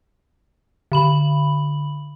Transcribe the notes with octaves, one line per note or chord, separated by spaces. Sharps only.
D3 B5 F#7